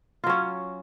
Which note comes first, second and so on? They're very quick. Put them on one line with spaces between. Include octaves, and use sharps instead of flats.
F4 F#3 C#4